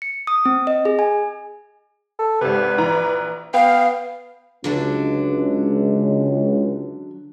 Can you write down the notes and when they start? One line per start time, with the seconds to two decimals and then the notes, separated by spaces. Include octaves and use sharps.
0.02 C#7
0.27 D#6
0.45 C4
0.67 D#5
0.85 G#4
0.99 G#5
2.19 A4
2.41 G#1 C3 B4
2.78 A#1 E3 A#5
3.54 B3 F5 G5
4.64 C#2 D3 F#3 D4